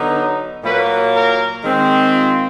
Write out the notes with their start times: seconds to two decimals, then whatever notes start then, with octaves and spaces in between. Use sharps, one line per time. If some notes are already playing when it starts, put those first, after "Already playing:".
Already playing: D3 F#3 B3 D#4
0.63 A#2 F#3 A#3 B4
1.13 A#4
1.63 D#3 G#3 C4
2.13 F4